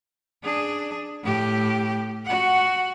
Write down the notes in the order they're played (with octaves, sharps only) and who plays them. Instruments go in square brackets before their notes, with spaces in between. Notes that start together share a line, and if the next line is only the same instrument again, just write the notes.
[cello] D4 G#4
A2 G4
F#4 F#5